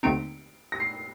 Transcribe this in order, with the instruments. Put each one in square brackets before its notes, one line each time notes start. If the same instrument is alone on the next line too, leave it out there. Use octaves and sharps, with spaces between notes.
[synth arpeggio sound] D#2 D3 A3 C4 D#4 [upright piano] D7
[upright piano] A#6
C7